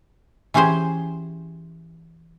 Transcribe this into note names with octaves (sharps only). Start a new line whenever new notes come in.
E3 C#4 G4 G#4 C5